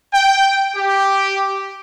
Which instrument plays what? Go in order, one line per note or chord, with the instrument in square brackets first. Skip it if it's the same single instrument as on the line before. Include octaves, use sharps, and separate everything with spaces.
[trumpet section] G5
G4